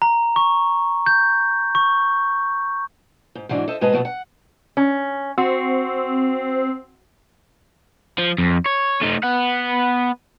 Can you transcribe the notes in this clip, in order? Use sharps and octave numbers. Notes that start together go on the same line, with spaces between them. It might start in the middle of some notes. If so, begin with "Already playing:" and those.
A#5
C#6
G6
C#6
G#2
G#2 E3 F#3 D4
A4 C5 D#5 E5
G#2 B2 G#3 B4 D#5 A5
B2 D#3 F#3 A3 B3
F#5
C#4
C4 F#4
F3
F2
C#5
A3 D#4
B3 F#5